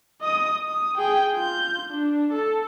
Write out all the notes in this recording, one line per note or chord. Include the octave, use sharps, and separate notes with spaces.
D#5 D#6
D#6
G#4 G5
F4 G6
D4
A4